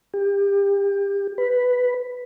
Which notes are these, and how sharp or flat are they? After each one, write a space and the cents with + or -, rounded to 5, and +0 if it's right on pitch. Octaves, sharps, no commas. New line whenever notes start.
G4 +30
B4 +5